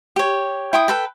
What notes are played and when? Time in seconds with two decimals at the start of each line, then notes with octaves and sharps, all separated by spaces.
0.16 G4 C#5
0.73 E4 G5 C6 D#6
0.88 A4 B4 G5